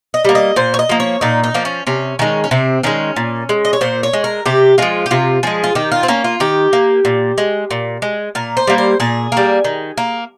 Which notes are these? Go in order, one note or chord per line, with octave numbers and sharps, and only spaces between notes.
D#5
G3 A#3
D#5
A#2 C5
C#5
D#5
F3 A#3
C#5
A#2 D#4
D#4
F3 A#3
C#4
C3 C#4
D#3 G#3 C#4
C#4
C3 C4
D#3 G#3 C#4
A#2
G#3
D#5
C#5
A#2 C5
C#5
G#3
A#4
C3 G4
F3 G#3 F4
G4
C3 F4
F3 G#3 G#4
F4
D#3 G4
F4
C4
A#3 C#4
F4
D#3 G4
A#3
A#2
G#3
A#2
G#3
A#2 A#4
C5
G3 A#3
C5
A#2 G#4
G3 A#3
D#3
A#3